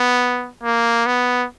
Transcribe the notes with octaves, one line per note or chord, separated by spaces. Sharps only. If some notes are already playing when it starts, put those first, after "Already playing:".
Already playing: B3
A#3
B3